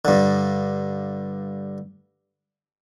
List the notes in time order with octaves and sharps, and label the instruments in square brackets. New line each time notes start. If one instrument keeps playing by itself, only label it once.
[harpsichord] G2 D3